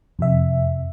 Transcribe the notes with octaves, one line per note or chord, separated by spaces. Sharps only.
F2 C3 E5